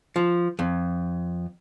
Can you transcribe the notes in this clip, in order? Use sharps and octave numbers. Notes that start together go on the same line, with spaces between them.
F3
F2